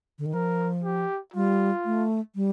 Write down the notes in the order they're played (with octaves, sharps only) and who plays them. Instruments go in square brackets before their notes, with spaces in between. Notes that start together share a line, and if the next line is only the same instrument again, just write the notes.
[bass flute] D3
D#3
[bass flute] F3 [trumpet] A#4
[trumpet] G4
[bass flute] G3 [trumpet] F4
[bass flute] A3
G3